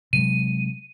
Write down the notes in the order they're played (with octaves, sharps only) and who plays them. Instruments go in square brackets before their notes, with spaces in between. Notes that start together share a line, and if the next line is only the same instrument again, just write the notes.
[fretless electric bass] C3 F#3 G#3 [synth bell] D#7